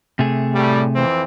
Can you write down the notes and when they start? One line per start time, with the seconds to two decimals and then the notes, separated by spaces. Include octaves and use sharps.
0.19 C3 A3 G#4
0.54 A2 G3
0.95 F2 E3 C4